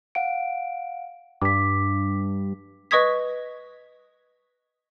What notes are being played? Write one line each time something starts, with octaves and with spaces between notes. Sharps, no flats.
F5 F#5 D7
G2 D6 B6
B4 D#5 C#6 D#6 G#6 B6